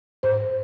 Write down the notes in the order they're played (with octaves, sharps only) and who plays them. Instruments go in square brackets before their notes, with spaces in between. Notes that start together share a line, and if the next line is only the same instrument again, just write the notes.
[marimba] G#2 C5